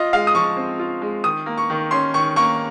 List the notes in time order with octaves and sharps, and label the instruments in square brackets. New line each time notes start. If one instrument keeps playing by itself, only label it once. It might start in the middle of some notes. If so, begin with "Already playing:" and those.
Already playing: [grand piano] F4 D#5
G#3 F5
D#6
F3 C#6
C4
F4
G#3
D#3 D#6
A#3
C#6
D#3
C#4 C6
D#3 C#6
A#3 C#6